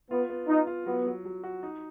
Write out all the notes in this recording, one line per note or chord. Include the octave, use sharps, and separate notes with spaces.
B3 F4
B3
D#4 F4
F4
F#3 B3
F#3
F#3
F#4
D#4